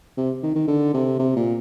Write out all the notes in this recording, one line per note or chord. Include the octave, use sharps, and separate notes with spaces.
C3
D#3
D#3
D3
C3
C3
A#2